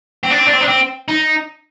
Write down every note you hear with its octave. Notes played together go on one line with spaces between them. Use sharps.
C4
D4
C4
D4
C4
D4
C4
D#4